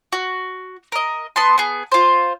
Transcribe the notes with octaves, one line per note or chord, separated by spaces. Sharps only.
F#4
A#4 D#5
B3 A5 C6
B3 G#4
F4 C5